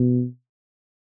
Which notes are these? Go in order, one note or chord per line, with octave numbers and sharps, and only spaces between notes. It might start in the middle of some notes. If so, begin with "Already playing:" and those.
Already playing: B2